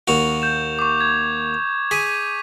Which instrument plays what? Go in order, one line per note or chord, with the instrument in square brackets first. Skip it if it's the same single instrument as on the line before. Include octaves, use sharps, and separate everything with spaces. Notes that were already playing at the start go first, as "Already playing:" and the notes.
[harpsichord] D#2 F#4 [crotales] F7
[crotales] G6 E7
C#6 D6
G#6
[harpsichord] G#4 [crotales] B6 D#7